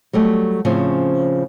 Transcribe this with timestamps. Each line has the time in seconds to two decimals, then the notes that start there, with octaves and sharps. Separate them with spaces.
0.13 F#3 G3 A3
0.65 A2 C#3 F3 C4 C#4